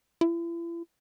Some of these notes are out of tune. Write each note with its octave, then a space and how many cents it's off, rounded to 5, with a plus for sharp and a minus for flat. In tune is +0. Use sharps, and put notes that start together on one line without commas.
E4 +40